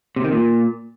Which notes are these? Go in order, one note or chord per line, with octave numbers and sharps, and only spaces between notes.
C3
D#3
A#2